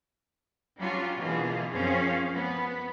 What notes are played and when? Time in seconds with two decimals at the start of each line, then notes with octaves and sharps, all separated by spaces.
0.79 F#3 G3 C#4 D4 F4 F#4
1.17 B2 D3 E3 A#3 F4 G#4
1.70 F#2 F3 C4 C#4 G#4 F5
2.36 B3